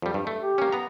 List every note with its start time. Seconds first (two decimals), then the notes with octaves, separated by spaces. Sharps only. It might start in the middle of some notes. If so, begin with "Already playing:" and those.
0.02 F2 G3
0.14 G2
0.27 A3
0.40 G4
0.58 A#3 C#4
0.72 B3 A#5